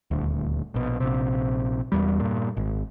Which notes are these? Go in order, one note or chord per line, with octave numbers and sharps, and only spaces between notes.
D#1 D2
A#1 B2
A#1 C3
E1 E2 G3
G2 A#2
G#1